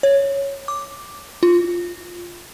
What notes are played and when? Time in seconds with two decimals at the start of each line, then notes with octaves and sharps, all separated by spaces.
0.03 C#5
0.68 D6
1.43 F4